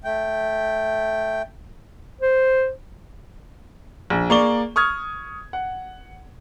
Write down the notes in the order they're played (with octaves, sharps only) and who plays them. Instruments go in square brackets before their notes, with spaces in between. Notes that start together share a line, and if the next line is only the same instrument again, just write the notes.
[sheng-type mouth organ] A3 G5
[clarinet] C5
[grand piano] A#1
A#3 G#4 D5 C#6 G7
C#6 D#6 F6 G#6
F#5